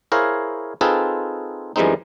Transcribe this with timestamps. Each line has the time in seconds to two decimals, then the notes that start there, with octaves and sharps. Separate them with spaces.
0.12 E4 G#4 A#4 C5 C#5 F5
0.81 C4 D#4 F4 G#4 A4 B4
1.76 F#2 E3 G3 G#3 C4 D#4